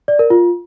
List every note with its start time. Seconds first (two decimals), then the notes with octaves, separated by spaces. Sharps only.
0.08 D5
0.19 A#4
0.30 F4